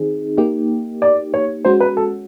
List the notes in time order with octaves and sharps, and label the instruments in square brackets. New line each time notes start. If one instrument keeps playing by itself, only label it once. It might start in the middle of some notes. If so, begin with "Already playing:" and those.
Already playing: [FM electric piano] D#3 C4 D#4 G#4
A#3 D#4 G4
[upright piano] D5
C#5
[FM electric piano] G#3 C#4 F#4 [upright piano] C5
[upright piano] B4
A4